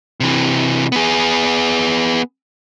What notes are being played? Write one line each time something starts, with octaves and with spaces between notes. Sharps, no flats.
C3 E3
B3 G#4